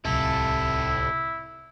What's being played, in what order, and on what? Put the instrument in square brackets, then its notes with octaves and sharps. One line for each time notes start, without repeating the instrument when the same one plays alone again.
[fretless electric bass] D1 C2 [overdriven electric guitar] C3 A4 [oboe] E4